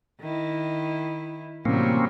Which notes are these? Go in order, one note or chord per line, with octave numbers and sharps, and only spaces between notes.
D#3 E4
A2 C3 E3 F#3 G3 A#3 C4 C#4